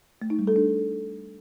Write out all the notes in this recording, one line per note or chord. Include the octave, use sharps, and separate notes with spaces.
A3
D#4
G3
A4
D4